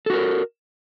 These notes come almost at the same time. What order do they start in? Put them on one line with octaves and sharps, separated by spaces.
A4 F#4 A#4